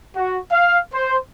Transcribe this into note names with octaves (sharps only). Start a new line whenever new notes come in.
F#4
F5
C5